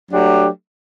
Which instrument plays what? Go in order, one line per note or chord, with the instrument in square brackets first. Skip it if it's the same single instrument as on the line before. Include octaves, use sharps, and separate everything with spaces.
[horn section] F#3 A3 D4 G4